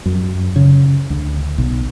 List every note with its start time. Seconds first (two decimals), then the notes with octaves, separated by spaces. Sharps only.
0.06 F#2
0.56 C#3
1.10 D2
1.58 B1